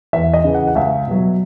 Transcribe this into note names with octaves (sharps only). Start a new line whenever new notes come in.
E2 E5
D#5
C#3 E3
F#5
F#5
C#2 E5
B2 F#3